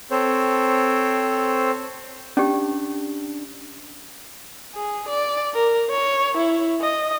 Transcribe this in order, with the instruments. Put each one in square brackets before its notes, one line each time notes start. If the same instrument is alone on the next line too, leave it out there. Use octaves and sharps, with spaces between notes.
[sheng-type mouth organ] C4 A4 C5 C#5
[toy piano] C#4 G4 [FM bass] D4
[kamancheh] G#4
D5
A#4
C#5
E4
D#5